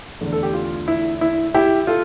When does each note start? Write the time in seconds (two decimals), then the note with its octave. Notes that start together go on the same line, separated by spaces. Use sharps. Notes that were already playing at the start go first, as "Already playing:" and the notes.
0.21 E2 D3 A3
0.32 A4
0.43 G4
0.54 F4
0.88 E4
1.21 E4
1.54 E4 G4
1.87 F4 A4